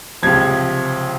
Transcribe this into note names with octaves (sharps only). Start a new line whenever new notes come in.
C#2 C3 F3 G#6